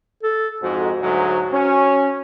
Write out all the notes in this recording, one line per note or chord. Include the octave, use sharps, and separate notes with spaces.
A4
F2 G#2 F#4
D2 G#2 F#3
C#4